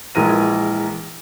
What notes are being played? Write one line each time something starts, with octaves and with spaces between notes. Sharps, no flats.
A#1 E3 G#3 A#4 D#7